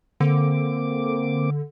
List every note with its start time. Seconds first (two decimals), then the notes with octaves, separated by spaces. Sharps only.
0.20 D3 A#3 C4 D6